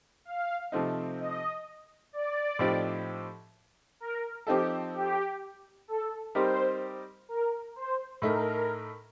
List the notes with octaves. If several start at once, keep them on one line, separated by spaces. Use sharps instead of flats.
F5
C3 F3 A3 C4 D#4
D#5
D5
A2 F3 C4 D#4 G4
A#4
F3 C4 D#4 G4 A4
G4
A4
G3 C4 D#4 G4 A#4 C5
A#4
C5
A2 A3 D#4 A4 A#4